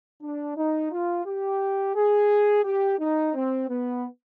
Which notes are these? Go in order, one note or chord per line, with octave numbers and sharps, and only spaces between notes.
D4
D#4
F4
G4
G#4
G4
D#4
C4
B3